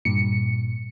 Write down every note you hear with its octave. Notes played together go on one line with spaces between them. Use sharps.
G2 A#2 C#7